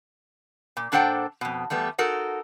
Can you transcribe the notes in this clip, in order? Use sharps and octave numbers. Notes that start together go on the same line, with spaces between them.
A#2
A#2 D4 A4 C5 F#5 G5
F2 B2
E2 G3 A3 B3
D#4 F#4 A4 A#4